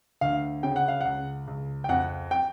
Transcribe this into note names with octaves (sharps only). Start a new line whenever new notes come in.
D2 F5
C#3 G5
F#5
F5
C#2 F#5
C#2
G5
F2 F#5
G5